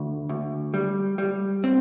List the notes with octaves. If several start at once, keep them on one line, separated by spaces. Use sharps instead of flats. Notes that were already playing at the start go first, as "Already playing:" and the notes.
Already playing: D2
D2
G3
G3
C4